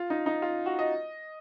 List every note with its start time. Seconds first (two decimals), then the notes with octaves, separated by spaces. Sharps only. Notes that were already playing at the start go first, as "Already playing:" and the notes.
Already playing: F4
0.10 D#4
0.26 D#4
0.42 F4
0.66 F#4
0.79 D#5